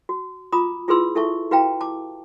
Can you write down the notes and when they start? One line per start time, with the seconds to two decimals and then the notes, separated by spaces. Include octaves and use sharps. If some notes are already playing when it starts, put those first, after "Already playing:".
0.09 F#4
0.52 F4 A#5 B5 D6 D#6
0.88 E4 F4 G#4 B4 C6 E6
1.15 E4 A4 E5 A5 C#6
1.51 E4 F#4 B4 F5 G5 A#5
1.81 A5 D6